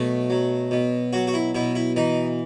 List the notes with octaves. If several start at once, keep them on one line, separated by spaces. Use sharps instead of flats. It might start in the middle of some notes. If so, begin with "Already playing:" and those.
Already playing: B2 F#3 A3
F#3
B2
F#3 F#4
F#4
E4
B2 E4
E4
E3 D#4